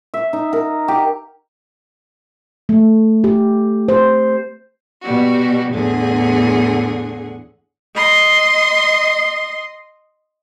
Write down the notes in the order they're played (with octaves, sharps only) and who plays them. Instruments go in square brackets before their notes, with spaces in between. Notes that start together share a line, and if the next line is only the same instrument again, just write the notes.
[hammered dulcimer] E5
D#4
A#4
G4
[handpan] A3
G4
C5
[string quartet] B2 G3 F#4
E2 A2 D3 G#4 F#5
[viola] D#5 C6